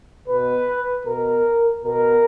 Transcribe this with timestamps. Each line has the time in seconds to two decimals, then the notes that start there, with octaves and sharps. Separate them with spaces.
0.27 B2 B4
1.05 B2 A#4
1.83 B2 A#4